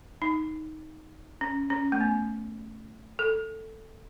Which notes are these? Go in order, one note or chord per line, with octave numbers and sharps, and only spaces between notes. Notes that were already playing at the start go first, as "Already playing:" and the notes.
D#4
C#4
C#4
A3
B3
A4